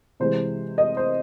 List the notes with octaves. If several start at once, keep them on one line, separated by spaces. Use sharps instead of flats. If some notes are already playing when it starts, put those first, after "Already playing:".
C3 E3 G#3 C5
D#5
C5